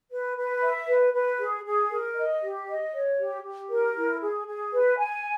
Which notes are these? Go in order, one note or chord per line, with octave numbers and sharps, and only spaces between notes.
B4
B4
E5
B4
B4
G#4
G#4
A#4
D#5
G4
D#5
C#5
G4
G4
A#4
E4
G#4
G#4
B4
G#5